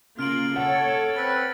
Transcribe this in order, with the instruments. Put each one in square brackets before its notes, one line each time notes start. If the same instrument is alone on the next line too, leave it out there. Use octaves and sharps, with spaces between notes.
[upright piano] C#3 [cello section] A#3 F4 [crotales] F6 D7 F#7
[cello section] A4 C#5 [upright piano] F#5
[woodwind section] C4 B4 [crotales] E6 A6